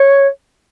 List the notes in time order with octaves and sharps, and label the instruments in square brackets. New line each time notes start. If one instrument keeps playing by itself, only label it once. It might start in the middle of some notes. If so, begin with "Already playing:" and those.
Already playing: [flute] C#5